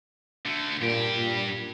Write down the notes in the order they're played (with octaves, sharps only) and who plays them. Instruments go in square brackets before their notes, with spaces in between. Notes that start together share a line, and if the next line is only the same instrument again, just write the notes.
[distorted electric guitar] D3 A3
[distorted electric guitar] G2 G4 [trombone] A#2
[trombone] A#2